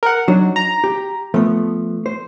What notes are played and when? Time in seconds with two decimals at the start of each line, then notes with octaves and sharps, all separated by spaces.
0.03 A#4 F#5
0.28 F#3 D4 D#4 F#4
0.56 A#5
0.84 G4
1.34 F3 A3 B3
2.06 C5